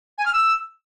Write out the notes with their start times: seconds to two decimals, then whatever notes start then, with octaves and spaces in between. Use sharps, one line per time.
0.18 G#5
0.25 F6
0.33 E6